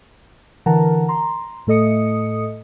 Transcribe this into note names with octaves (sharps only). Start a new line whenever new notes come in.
D3 E3 A#4 F#5 A5 A#5
A#5 C6
A2 A3 A4 D#5 D#6 C#7